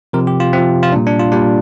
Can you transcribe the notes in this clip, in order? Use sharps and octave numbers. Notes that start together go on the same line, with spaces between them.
C3 F3 A#4
G4
F4
C3 C4
F3
F4
A#2 G3 D4
D4
F4
A#2 G3 D4